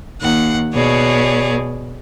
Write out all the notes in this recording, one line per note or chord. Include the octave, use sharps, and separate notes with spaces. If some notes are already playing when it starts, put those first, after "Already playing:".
D#2 F#5
B2 G#4 C#5 D5